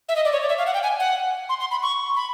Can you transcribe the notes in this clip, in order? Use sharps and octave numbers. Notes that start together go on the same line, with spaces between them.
E5
D#5
D5
C#5
D5
E5
F5
F#5
G5
G#5
F#5
C6
C6
B5
C#6
B5